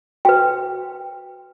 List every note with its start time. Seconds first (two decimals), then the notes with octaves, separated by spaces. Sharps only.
0.25 F#4 B4 G5